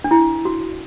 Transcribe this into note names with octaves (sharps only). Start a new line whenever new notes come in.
D4
E4
F#4